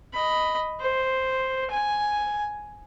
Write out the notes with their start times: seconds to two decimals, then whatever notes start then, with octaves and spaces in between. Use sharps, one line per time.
0.13 D#5 B5
0.80 C5
1.70 G#5